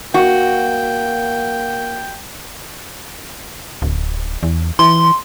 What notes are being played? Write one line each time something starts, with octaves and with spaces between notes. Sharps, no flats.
A#3 F#4 G5
D1
E2
E3 C6